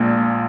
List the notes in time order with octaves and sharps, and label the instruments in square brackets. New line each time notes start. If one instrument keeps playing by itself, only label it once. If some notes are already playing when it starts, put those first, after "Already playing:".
Already playing: [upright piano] A#1 A#2 G#3